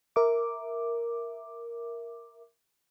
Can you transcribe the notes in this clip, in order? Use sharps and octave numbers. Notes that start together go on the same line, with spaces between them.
A#4 E5 D6